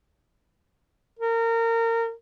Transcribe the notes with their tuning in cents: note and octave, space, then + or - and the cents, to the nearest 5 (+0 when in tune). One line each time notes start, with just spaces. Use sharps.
A#4 -25